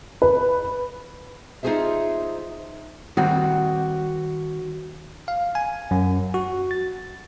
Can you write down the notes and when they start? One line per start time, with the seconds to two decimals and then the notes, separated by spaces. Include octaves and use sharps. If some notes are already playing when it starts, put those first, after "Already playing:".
0.22 B4
1.63 D#4 F4 F#4 G#4 C5 E5
3.17 D#3 G3 C4 F#4
5.28 F5
5.55 G#5
5.91 F#2
6.34 F#4
6.71 A6